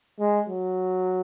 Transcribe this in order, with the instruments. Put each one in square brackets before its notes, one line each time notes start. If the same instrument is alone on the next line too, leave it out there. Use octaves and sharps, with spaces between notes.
[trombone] G#3
F#3